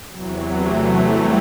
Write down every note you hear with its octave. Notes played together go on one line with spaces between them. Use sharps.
E2 C3 E3 F#3
A3
G3